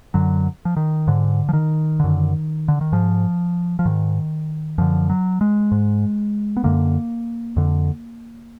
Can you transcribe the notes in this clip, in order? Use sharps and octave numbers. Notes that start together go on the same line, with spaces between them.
F#2 D3 F#3
F3
D#3
G#2 D3
F3
D#3
F#2 D3
D3
D#3
G#2 F3
F3
G#2 D#3
F#2 D3 F3
F#3
G#3
G#2
B3
F#2 D3 A#3
F2 D3